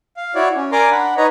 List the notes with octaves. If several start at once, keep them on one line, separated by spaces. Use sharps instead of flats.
F5
E4 F#4 C#5 D5
C#4
A#4 D5 G#5 A#5 C6 D6
D4 F#5 B5
D#4 B4 C#5 D#5 A#5